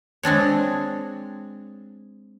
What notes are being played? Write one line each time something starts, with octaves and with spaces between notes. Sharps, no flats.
G#3 C4 D4 C#5